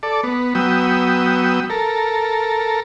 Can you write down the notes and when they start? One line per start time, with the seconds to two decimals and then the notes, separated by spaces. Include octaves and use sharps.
0.03 A4 D5
0.23 B3
0.55 F#3 B3 G5 D#6 E6
1.70 A4 A#4